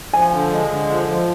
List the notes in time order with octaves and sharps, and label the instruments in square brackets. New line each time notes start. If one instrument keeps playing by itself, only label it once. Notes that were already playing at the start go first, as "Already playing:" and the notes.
[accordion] F3 [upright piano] G#5
[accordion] D3
G#3
D3
F3
F3